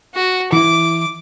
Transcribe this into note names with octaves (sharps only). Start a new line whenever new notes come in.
F#4
E3 E4 D6